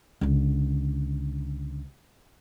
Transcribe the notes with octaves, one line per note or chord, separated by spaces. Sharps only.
C#2 D3